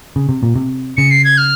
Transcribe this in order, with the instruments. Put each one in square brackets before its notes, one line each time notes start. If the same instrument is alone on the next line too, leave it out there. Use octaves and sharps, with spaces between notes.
[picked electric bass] C#3
C3
A#2
C3
[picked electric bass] C#3 [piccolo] C#7
[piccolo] C7
G#6
F6